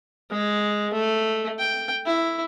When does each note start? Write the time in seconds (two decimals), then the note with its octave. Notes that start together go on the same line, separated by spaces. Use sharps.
0.30 G#3
0.93 A3
1.59 G5
2.06 E4